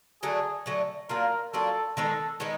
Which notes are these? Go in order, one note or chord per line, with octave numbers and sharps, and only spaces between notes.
D3 F#3 A3 G#4
D3 F#3 A3
F#3 A#3 D4 F4 A#4
F#3 A#3 D4 F4 A4
D#3 G#3 B3 D#4 A4
D#3 G#3 B3 D#4